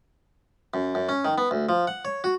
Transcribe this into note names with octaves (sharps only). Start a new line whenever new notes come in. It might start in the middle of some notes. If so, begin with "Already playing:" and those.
F#2
F#2
C#4
D#3
B3
D2
F3
F#5
C#5
F#4